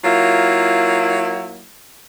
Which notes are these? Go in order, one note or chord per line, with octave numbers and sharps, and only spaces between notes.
F#3 A#3 E4 F4